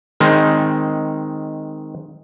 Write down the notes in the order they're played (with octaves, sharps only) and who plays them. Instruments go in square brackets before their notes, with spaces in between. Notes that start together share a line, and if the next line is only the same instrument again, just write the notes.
[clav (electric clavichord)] D#3 G#3 C4